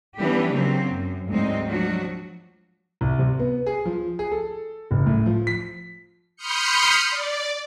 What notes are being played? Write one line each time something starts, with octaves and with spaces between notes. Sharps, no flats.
E3 G3 B3 C#4 D4 G4
C#3 F#3 A#3 C4
F#2
D2 G#2 F#3 G#3 C4 D#4
F3 F#3 D4 F#4
C2
C3
B3
G#4
F3
G#4
A4
F#1
A2
F3
B6
B5 C6 D#6 F6 G6 C#7
D5